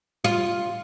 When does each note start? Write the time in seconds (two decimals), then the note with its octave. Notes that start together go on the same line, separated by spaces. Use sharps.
0.24 F4